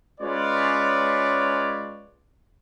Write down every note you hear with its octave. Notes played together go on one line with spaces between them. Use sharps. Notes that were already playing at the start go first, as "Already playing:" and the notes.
G#3 C#4 F4 B4 C#5 D5